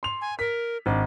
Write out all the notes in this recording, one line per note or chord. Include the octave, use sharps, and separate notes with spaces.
C6 F7
G#5
A#4 B6
G#1 D4